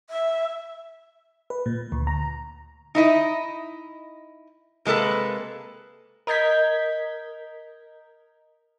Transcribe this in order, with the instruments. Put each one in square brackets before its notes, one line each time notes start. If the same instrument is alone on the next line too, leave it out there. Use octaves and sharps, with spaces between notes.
[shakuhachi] E5
[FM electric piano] B4
A#2
D2
A#5
[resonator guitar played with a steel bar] D#4 E4 D#5
C3 G#3 A#3 A4 B4
[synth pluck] A#4 D#5 G6 G#6 B6